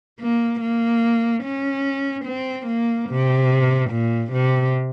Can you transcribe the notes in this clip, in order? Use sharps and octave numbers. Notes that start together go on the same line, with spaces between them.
A#3
A#3
C#4
C4
A#3
C3
A#2
C3